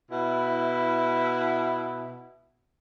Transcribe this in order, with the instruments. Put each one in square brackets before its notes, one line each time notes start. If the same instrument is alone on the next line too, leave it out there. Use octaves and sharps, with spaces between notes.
[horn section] B2 E4